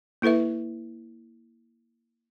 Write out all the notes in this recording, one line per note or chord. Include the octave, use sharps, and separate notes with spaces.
A#3 E4 A4 B4 E5